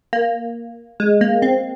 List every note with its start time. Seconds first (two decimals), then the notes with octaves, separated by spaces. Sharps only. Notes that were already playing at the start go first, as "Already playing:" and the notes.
0.13 A#3
1.00 G#3
1.21 A#3
1.42 C4